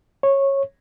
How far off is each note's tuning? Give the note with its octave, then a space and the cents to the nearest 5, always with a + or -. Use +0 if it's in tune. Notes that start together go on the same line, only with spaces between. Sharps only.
C#5 -15